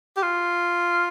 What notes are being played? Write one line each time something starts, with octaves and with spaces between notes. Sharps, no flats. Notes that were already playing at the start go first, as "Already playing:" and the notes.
G4
F4